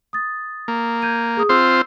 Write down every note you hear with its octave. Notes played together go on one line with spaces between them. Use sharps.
D#6 A6
A#3
G6 G#6 D#7
G#4 D#6
C4 F4 C5 E6